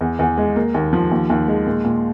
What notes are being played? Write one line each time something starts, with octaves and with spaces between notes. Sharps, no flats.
E2
E2
G#3
A#3
D#2
F3
D#2
D#2
G#3
A#2
A#2